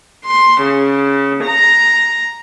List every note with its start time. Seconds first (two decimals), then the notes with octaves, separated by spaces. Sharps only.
0.24 C6
0.60 C#3
1.43 A#5